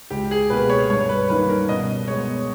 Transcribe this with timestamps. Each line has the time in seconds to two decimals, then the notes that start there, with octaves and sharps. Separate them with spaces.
0.10 C#2 G4
0.31 G#4
0.50 B2 A#3 B4
0.70 C#5
0.90 G2 C#5
1.01 C#5
1.09 B4
1.29 D#3 G3 A#3 C#4 B4
1.49 A#4
1.69 B2 D#5
2.08 G#3 B3 C#5